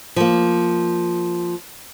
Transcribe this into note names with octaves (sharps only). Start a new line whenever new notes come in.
F3 A#3